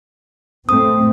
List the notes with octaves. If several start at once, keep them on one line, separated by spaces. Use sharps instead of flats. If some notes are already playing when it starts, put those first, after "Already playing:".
A2 A3 C4 D#6